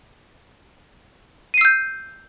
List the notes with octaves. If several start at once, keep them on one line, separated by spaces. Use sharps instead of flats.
E6 G6 C7 D#7